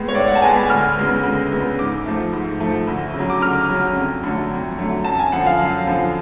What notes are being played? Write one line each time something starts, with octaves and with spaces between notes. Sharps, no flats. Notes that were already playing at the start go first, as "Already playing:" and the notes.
Already playing: A2 G#3 B3
C#5
A2 D5
F#5
A5
G#3 B3 G#5
B5
D2 F6
C#3 G#3 B3
D2
C#3 G#3 B3
G#2 D6
F3 A3
G#2
F3 A3
D2
C#3 F#3
D6
D2 F6
C#3 F#3
F2
D3 F#3 A3
F2
D3 F#3 A3
F#2 A5
G#5
D3 F3 F#5
F5
F#2
D3 F3